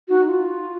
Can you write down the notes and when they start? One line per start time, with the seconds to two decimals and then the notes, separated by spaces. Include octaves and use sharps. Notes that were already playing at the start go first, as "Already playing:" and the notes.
0.08 D#4 F#4
0.19 D#4
0.29 F4